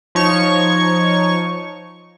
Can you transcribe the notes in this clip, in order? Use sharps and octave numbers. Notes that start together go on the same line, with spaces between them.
F3 D#4 C#5 C#6